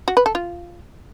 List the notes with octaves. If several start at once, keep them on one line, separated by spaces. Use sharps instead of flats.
F#4
B4
A4
F4